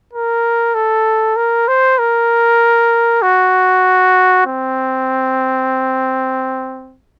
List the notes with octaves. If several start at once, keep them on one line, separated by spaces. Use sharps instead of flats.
A#4
A4
A#4
C5
A#4
F#4
C4